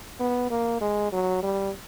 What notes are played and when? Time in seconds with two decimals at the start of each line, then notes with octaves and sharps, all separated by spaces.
0.20 B3
0.50 A#3
0.81 G#3
1.12 F#3
1.43 G3